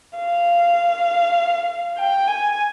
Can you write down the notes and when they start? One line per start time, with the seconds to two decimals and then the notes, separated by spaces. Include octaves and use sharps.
0.18 F5
1.97 G5
2.27 G#5